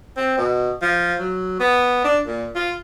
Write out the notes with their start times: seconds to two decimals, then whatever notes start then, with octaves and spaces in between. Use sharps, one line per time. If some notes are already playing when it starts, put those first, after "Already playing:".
0.17 C4
0.38 B2
0.82 F3
1.20 F#3
1.60 B3
2.04 D4
2.26 A#2
2.55 F4